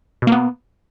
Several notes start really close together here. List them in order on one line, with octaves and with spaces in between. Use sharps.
B2 A#3 B3